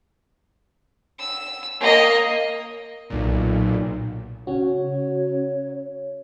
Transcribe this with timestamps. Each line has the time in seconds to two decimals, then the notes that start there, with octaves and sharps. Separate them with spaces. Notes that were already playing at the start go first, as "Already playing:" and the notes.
1.19 E6
1.80 A#3 D#5
3.10 B1 A#2
4.47 C#3 C#4 F#4 C#5